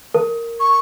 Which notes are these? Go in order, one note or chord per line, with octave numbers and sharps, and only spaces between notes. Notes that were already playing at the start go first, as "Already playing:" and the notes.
A#4
C#6